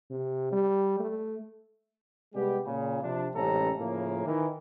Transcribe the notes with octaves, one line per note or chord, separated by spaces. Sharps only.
C3
G3
A3
C3 G3 G#3 B3 G4
A#2 C#3
C3 F3 D4
A1 G#2 C3 C#4 A4 A#5
A2 C#3 F3 A3 A#3
D#3 E3